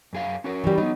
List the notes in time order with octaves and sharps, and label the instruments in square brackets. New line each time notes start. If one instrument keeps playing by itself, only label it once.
[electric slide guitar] F#2 G#4 F5
C#4 F#4 A#4
[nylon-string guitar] E3 G3
[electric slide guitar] F#3 B3 [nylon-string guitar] D#4